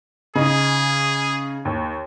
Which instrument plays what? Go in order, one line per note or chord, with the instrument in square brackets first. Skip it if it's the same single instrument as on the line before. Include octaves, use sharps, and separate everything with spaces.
[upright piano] C#3 D#4 [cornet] G#4
[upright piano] D#2